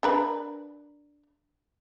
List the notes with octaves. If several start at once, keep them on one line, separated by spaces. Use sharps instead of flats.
D4 A#4 B4